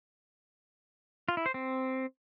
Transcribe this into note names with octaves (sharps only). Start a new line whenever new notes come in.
F4
E4
C5
C4